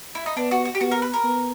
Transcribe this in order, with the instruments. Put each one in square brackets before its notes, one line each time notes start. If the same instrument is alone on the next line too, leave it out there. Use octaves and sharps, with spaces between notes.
[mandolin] E4
D#4
[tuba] B3 [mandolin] D4
[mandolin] F#4
F#4
G4
[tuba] B3 [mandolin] F#4
[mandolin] A#4
B4
A#4
[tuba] B3